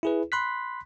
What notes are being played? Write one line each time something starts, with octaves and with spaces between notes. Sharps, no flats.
E4 G#4 B4
B5 C6 F#6 B6